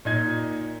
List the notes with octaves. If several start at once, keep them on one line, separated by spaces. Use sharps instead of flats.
A#2 D#4 G#6